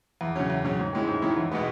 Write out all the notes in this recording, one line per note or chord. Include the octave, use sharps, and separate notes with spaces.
E2
C#3 F#3 C#4
E2
C#3 F#3 C#4
G#2
D#3 G#3 C#4 E4
G#2
D#3 G#3 C#4 E4
E2
B2 G#3 B3